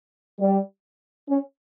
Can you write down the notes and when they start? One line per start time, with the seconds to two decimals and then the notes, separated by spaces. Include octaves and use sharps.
0.39 G3
1.29 C#4